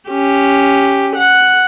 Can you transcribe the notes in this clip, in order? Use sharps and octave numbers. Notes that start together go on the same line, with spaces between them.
C#4 G4
F#5